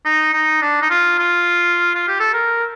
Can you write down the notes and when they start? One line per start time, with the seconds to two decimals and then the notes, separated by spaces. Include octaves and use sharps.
0.05 D#4
0.33 D#4
0.62 D4
0.82 D#4
0.90 F4
1.19 F4
1.95 F4
2.08 G4
2.20 A4
2.33 A#4